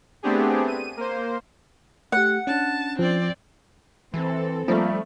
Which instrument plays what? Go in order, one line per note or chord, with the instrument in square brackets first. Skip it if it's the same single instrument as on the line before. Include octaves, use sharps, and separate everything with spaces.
[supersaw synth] A3 B3 C4 D4 G4 G#4
D#7
A#3 C5
[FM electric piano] A3 G4 [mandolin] F#5
[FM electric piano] C#4 D4 [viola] A5
[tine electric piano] F3 [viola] C4 D5
[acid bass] E3 [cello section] C4 A4
[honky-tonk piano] F3 A3 [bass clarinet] G3 [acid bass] A#3